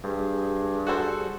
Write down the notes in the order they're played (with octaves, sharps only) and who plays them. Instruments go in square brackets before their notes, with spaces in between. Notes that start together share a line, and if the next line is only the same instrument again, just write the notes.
[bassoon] G2 [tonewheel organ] G3 G#4
[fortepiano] F#4 A4 C5